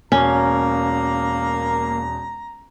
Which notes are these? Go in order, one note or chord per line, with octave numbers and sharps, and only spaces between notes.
E1 A#3 C#4 A#5